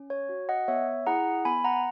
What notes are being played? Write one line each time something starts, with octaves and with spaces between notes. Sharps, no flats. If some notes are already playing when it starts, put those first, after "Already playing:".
Already playing: C#4
C#5
F#4
D#5 F#5
B3 C#5 E5
E4 G#4 F#5 A#5
B3 G#5 B5
F#5 A#5